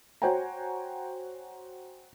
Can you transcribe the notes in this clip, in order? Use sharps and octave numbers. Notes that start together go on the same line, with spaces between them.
F#4 C5 C#5 G5 G#5 A#5